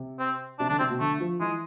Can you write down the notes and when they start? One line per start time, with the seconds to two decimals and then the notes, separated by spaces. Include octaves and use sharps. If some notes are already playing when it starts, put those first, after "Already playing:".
Already playing: C3
0.19 C4
0.59 C3 D4
0.69 D3 D4
0.79 C3 C4
0.90 B2
1.00 D3 A3
1.20 F3
1.40 E3 G#3